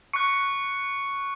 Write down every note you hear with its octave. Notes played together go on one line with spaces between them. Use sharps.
C#6 F#6 C#7